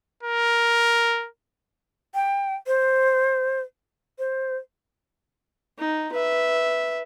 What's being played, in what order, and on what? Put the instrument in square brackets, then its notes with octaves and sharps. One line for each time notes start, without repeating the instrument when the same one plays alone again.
[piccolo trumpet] A#4
[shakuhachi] G5
C5
C5
[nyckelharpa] D#4
B4 E5